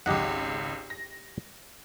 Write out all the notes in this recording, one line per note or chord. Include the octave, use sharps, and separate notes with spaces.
G#1 C#2 G4 D#5 F#5
A#6